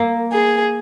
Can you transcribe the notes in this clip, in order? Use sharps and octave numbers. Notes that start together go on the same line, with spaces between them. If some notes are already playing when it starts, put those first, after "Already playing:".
Already playing: A#3
G#4